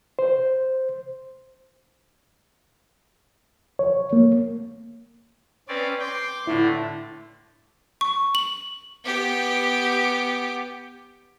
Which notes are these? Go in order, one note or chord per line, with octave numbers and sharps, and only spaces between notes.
C5
C#5
A#3
C4 C#4 B4 D5
G5 C6 D6
A2 D3 A3 E4
C#6
F#7
B3 G4